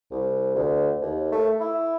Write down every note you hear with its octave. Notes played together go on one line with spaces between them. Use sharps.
C2
D2
D#2
A3
E4